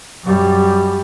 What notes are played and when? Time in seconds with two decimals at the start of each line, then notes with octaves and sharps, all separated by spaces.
0.23 F#2 G3